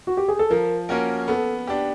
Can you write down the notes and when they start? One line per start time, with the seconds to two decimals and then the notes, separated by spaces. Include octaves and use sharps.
0.07 F#4
0.17 G4
0.28 G#4
0.39 A4
0.50 F3 A#4
0.89 A#3 C#4 F#4 A#4
1.28 B3 A4
1.67 D4 G4